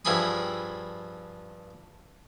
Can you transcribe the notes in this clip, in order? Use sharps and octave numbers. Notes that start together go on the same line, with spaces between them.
G2 F3 E4 G#4 B5 D#6